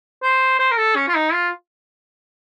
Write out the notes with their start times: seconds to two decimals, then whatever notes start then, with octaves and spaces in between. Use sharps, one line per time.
0.23 C5
0.59 C5
0.71 A#4
0.78 A4
0.96 C#4
1.08 F4
1.15 D#4
1.33 F4